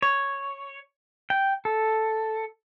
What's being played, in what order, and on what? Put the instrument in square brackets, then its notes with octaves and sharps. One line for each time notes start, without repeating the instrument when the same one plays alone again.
[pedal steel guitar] C#5
G5
A4